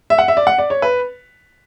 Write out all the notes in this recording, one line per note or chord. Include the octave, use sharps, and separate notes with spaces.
E5
F#5
E5
D5
F#5
D5
C#5
B4